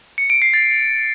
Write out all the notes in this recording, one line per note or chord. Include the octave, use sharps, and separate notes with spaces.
C#7
D7
C7
A6